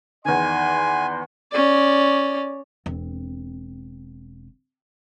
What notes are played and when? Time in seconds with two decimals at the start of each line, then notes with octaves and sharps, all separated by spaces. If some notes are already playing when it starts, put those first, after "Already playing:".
0.25 E2 D#3 B4 D5 G#5 C6
1.52 C#4 D5
2.86 E1 C4